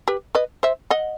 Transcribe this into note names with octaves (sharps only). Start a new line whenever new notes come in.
G4 B4
B4 D#5
C5 E5
D#5 F#5